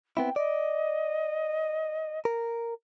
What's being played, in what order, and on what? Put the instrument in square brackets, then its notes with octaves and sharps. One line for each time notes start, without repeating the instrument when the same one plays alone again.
[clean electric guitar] B3 C4 E4 [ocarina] G5
[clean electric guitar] D5 [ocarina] D#5
[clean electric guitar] A#4